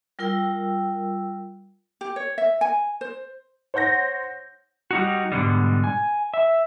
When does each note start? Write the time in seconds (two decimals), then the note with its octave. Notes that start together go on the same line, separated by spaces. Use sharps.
0.19 G3 F4 A#4 G5 E6
2.01 G4
2.16 C#5
2.38 E5
2.61 G#5
3.01 C5
3.74 C5 C#5 F#5 G6 A#6
4.91 G3 D#4 F#4
5.32 G#2 B2 D3 G3
5.84 G#5
6.34 E5